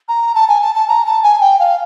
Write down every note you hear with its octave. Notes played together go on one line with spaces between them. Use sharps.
A#5
A5
G#5
A5
A5
A#5
A5
G#5
G5
F5